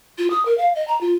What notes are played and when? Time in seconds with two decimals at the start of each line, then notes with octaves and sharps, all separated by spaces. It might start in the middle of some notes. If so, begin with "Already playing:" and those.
0.18 F4
0.30 D#6
0.45 A#4
0.58 F5
0.75 D#5
0.88 A#5
1.01 F4